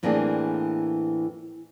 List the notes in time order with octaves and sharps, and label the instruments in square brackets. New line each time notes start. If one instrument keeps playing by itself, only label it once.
[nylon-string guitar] A2 E3 A#3 C4 D4 G#4